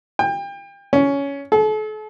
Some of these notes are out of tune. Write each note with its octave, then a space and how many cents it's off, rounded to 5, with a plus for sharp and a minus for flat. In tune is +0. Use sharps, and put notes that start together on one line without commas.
G5 +30
C#4 +15
A4 -40